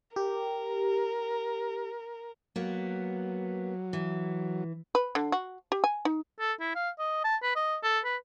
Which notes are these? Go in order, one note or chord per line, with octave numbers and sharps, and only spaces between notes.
G4 A#4
F#3 A#3 B3
E3
B4
D3
F#4
G4
G#5
D#4
A4
E4
F5
D#5
A5
B4
D#5
A4
B4